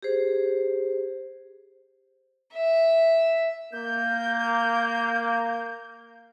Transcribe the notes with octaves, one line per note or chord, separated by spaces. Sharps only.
G4 G#4 C5
E5
A#3 G6